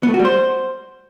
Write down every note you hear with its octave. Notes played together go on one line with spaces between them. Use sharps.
B3
A3
F#4
G3
C5